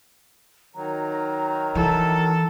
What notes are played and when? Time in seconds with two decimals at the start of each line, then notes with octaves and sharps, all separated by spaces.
0.75 D#3 F#3 A#5
1.75 E3 A4